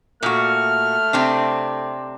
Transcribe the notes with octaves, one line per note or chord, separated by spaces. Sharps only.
A#2 A3 F#4 F6
C3 C4 D4